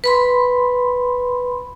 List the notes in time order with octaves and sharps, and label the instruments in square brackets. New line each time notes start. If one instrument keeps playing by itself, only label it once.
[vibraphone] B4 B5 C6